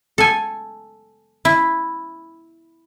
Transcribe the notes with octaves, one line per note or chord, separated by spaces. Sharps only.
A4 G#5
E4